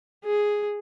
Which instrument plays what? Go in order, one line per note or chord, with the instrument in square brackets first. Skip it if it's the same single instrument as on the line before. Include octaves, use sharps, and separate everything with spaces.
[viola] G#4